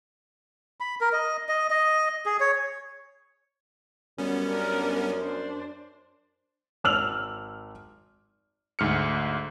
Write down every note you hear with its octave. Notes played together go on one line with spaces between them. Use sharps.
B5
A#4
D#5
D#5
D#5
G#4
C#5
F#2 G3 B3 C#4
D4 A#4
D4 C5
G#1 E6 F6 F7 F#7
D2 G#2 F6 C#7